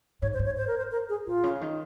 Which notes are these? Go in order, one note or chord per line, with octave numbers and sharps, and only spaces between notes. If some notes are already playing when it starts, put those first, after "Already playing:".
G#2 C#5
C5
G#2
C#5
C5
A#4
C5
A#4
G#4
A#2 F4
C#3
D#3